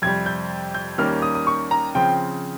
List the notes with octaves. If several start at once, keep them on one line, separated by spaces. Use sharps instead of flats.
F2 C3 G3 G#6
G6
G6
D#2 D#3 G3 A#3 C#4 F6
D#6
D#6
C#6
A#5
C#3 F3 C4 G5